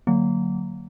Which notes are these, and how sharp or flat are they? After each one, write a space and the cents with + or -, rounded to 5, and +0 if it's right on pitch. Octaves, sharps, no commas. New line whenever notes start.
D3 +0 F#3 +0 A#3 -15